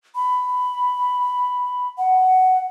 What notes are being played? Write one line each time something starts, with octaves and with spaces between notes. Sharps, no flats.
B5
F#5